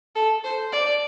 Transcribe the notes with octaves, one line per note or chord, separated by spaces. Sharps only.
A4
C5
D5